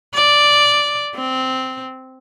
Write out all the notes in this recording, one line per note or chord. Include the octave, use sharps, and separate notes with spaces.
D5
C4